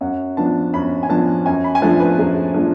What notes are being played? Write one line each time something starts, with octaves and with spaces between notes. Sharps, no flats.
F#2 F#5
F3 B3 D4 A5
F#2 B5
G#5
F3 B3 D4 A5
F#2 G#5
B5
G#5
F3 A3 D4 A5
B4
F#2 G#4
F3 A3 D4